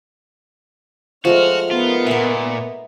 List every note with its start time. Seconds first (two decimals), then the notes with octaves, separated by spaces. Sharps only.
1.25 F3 G#3 A3 F#4 F6
1.71 B3 D#4 F4 A#4
2.07 A#2 E5 F#5